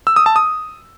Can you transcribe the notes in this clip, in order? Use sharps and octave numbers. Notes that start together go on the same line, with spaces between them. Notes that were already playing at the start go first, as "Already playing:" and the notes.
E6
D#6
A5
D#6